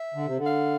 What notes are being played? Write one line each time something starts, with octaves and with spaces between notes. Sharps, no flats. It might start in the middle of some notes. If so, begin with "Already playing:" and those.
Already playing: E5
D3
C3
D3
F5